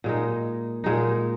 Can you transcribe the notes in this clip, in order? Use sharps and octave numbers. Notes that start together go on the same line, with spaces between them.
A#2 G#3 D#4
A#2 G#3 D#4